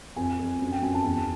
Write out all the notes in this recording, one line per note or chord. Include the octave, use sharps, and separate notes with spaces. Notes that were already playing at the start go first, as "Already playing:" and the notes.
F2 G#5
F2
F#2
G5
F#2 G#5
A5
E2